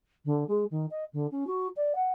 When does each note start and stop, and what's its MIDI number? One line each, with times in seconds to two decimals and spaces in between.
0.25 0.44 50
0.48 0.64 56
0.71 0.86 51
0.90 1.04 75
1.13 1.27 50
1.31 1.44 61
1.47 1.67 66
1.76 1.93 74
1.95 2.12 78